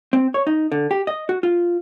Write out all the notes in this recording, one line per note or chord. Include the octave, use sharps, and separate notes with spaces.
C4
C#5
D#4
D3
G4
D#5
F#4
F4